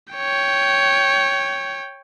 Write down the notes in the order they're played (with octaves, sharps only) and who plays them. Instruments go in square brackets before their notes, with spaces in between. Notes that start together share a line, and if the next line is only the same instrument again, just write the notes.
[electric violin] C#5 G5